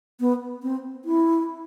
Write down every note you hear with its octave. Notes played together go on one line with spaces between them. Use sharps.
B3
C4
E4